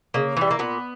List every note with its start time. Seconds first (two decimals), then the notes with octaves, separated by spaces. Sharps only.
0.14 C#3 A#3
0.37 E3 G3
0.51 A#3
0.59 A#2 B3